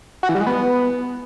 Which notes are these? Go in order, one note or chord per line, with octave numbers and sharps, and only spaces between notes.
F#4
E3
G3
G#3
B3